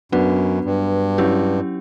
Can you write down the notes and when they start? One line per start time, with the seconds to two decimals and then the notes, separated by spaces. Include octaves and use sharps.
0.12 F#2 F#3 B3 D4 F#4 B4
0.64 G2
1.18 F#3 C#4 E4 G4